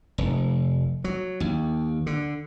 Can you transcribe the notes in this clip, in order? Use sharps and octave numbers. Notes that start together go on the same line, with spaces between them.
F1
F#3
D#2
D3